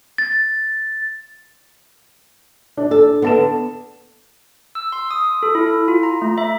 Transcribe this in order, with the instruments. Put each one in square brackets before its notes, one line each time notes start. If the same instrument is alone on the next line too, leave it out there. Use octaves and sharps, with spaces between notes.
[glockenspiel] A6
[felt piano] D4
[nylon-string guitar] A4
[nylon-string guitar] D3 [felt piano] B3 A5 E7
[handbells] E6
C6
D#6
A4
E4
F4
A#5
A3
E5